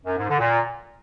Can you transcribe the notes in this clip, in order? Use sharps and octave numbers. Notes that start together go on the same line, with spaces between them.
F#2
G#2
D3
A#2